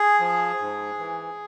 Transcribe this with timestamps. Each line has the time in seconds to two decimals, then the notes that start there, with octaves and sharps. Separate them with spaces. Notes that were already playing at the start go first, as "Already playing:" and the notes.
Already playing: G#4
0.20 F3
0.59 G#2
0.99 E3